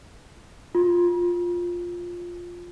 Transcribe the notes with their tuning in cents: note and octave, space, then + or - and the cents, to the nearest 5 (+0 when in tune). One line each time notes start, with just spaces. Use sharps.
F4 +5